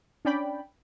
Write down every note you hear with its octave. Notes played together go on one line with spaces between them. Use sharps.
C#4 D4 D5 G5 B5